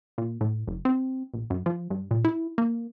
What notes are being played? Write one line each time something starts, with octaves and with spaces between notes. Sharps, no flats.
A#2
A2
F#1
C4
A#1
F#2
F3
G2
A#2
E4
A#3